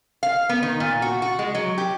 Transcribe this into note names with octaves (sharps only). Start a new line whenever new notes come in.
F5
B3
D#3
A#2
F#4
F#4
G#3
F#3
G4